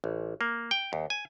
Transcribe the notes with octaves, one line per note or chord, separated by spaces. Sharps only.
A1
A#3
G5
D#2
G#5